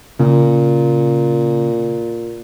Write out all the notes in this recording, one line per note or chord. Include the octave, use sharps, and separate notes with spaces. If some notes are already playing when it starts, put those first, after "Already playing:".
A#2 C#3